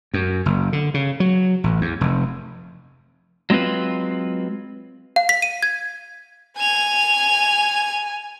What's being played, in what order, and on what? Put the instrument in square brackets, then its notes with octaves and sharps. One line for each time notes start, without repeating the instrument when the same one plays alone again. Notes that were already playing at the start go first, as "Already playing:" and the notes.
[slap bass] F#2
F#1
D3
C#3
F#3
A1
E2
F1
[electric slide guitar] F#3 G#3 C4 F4 B4
[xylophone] F5
B6
D#7
G#6
[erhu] G#5 [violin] G#6 F7